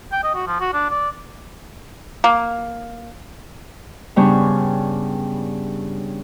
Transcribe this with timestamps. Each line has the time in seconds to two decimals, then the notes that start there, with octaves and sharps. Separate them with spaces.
0.12 G5
0.23 D#5
0.35 F#4
0.47 F3
0.60 F#4
0.73 D4
0.90 D5
2.24 A#3
4.16 G2 C#3 G3 B3 D4 C#5